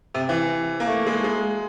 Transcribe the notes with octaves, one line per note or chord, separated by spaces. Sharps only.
C3
E3
A#3
A3
G#3
G#3